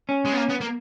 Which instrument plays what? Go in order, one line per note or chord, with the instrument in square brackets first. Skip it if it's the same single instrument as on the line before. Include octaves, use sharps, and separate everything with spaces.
[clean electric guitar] C#4
[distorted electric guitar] G#3
B3
A#3
B3
A#3